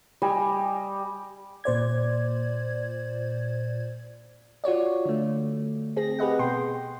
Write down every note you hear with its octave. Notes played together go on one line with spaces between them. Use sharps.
G3 D#5 G#5
A#2 C5 D5 G#6
F4 F#4 C#5 D5
D3 A3
C4 G#4 A#6
G4 G#4 B4 D#5 F#5
B2 G5 C6